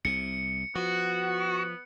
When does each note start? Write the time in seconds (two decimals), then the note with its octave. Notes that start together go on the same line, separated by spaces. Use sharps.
0.05 C2 C3 C#7
0.76 F3 B3 F#4